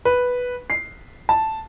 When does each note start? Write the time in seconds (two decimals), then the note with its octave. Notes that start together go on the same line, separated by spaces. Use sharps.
0.05 B4
0.70 C7
1.29 A5